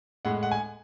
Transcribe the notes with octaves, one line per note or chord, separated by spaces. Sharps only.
A2 G#3 F#5
F#5
G#5